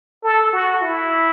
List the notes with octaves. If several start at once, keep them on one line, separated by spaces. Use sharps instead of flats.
A4
F#4
E4